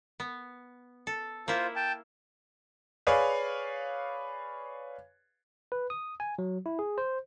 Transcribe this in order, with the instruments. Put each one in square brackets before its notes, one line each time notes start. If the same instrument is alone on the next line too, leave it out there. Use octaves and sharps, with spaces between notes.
[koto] B3
A4
[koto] A#3 E4 [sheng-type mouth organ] F4 C5
[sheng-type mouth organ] G5 A5
[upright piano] G#4 B4 C#5 D5 F5
[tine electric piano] B4
D#6
G#5
F#3
E4
G#4
C5